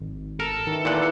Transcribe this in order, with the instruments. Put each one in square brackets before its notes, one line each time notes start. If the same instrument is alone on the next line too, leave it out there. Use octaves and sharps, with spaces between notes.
[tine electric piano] G#1
[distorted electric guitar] A4 [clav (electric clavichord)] A#4
[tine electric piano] D#3 [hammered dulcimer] E3 G3 C#4
[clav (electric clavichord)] E2 A#2 F#5 [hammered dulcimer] B3 E4 G4